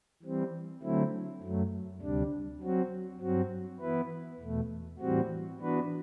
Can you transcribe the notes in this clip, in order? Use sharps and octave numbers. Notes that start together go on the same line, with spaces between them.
E3 G3 C4
D3 F#3 A3 C4 E4
F#2 F#3 A3
D2 C3 G3 D4
F#3 C4 F#4
G2 F#3 C4 F#4
E3 B3 E4 B4
E2 B2 A3
A2 E3 G3 C4 F#4
E3 B3 D4 F#4 B4